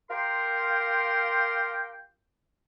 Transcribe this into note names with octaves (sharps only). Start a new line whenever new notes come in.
F4 G4 A#4 G5 C6